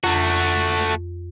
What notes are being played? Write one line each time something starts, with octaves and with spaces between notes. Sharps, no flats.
F2 A3 F#4